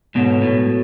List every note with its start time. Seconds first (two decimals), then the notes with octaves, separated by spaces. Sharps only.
0.15 G#2 B2 F#3 B3 F#4 A4 C#5
0.42 A2